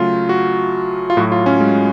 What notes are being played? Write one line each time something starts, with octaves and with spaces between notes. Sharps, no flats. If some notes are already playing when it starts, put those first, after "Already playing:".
Already playing: C#3 F#3 A3 F4
F#4
F4
A2 F#3 F#4
F4
C#4
G#3